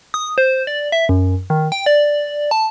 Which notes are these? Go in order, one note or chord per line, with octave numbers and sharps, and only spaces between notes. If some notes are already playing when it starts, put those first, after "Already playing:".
D#6
C5
D5
E5
F#2
D#3
G5
D5
A5